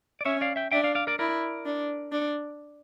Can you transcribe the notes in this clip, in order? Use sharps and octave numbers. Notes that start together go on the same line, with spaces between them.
D5
C#4 C#5 E5
D5 F5
E5 G5
D4 E5 G5
D5 F5
D5 F5
A#4 D5
E4 A#4 D5
D4
D4